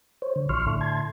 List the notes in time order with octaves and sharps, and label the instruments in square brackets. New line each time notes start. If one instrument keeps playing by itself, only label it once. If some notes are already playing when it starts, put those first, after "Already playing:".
[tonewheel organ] C5 C#5
D3
[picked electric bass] A#1 [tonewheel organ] C6 C#6 F6
[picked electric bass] A2 D3
[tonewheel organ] A5 C6 G#6